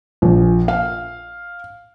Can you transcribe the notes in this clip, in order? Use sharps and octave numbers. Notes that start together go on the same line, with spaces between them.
A#1
F5